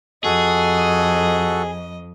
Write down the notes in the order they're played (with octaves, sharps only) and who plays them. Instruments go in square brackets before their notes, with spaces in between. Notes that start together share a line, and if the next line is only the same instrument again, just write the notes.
[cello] F2 [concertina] F#4 A4 [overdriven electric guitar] G#4 [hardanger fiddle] D#5